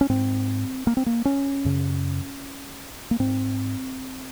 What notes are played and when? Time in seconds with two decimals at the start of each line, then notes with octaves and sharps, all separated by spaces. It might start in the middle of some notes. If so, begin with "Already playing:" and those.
0.01 C#4
0.09 G#2 C4
0.87 A#3
0.97 C4
1.06 A#3
1.25 C#4
1.65 F#2 C#3
3.11 A#3
3.19 G#2 C4